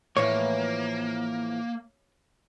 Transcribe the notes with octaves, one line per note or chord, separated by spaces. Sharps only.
A2 E3 F3 A#3 C#5